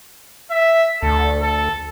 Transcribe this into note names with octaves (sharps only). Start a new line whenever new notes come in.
E5
D2 A4
A4